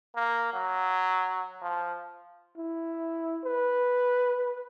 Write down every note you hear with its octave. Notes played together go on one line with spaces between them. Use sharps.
A#3
F#3
F3
E4
B4